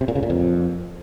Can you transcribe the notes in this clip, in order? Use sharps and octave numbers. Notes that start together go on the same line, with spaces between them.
C3
A#2
C#3
A#2
F2